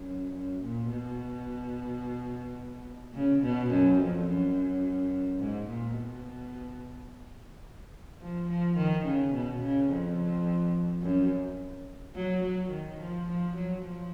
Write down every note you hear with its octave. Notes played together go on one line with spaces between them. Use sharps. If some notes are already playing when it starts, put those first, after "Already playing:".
Already playing: F#2
F#2
A#2
B2
C#3
B2
F#2
F2
F#2
G#2
A#2
B2
F3
F3
D#3
C#3
B2
C#3
F2
F#2
F#3
F#3
D#3
F3
F3
F#3
F3